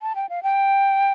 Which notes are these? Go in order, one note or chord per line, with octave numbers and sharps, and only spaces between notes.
A5
G5
F5
G5